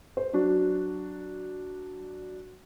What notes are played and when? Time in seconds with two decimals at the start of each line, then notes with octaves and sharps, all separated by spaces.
0.17 C5
0.33 F#3 D4 F#4